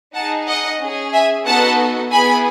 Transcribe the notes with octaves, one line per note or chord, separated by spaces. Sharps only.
D#4 G#4 F#5 A5
D#5 F#5
C#4 G#4
E5 G#5
B3 D#4 F#4 A4 F#5 A5
B3 E4 G#4 G#5 B5